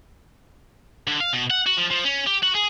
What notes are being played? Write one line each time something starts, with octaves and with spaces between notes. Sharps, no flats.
D3
F5
B2
F#5
F#4
F3
F3
C#4
G4
F#4
G#4